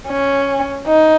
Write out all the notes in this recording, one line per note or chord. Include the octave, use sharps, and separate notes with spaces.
C#4
D#4